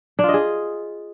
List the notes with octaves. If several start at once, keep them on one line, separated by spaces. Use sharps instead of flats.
D4
F4
D#5
G#4